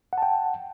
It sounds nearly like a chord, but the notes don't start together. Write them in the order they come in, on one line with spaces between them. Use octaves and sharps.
F#5 A5 G5